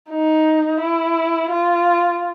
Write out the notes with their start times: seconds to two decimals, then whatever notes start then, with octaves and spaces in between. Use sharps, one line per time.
0.10 D#4
0.81 E4
1.51 F4